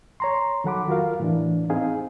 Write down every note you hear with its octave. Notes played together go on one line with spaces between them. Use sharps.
C#5 A#5 C6
D#3 F#3 A4 F#5 B5 D6
F4 F#4 A#4 F5
A2 E3 D4
C4 D#4 G#4 F5